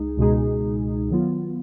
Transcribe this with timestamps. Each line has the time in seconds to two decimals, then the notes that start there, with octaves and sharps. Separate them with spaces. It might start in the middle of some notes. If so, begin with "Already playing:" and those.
Already playing: C#2 G#3 D#4 G#4
0.17 C#2 B2 G#3 D#4 G#4
1.10 D#3 F#3 B3 F4